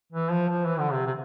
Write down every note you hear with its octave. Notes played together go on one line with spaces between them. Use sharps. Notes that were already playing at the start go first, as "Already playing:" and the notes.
E3
F3
F3
E3
D3
C3
C3